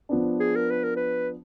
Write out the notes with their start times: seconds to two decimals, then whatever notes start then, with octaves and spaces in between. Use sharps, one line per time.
0.09 F3 B3 D4
0.40 G#4
0.56 A#4
0.71 B4
0.84 A#4
0.96 B4